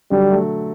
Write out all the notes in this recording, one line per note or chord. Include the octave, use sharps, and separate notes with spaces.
D3 F#3 G3
F#3 A3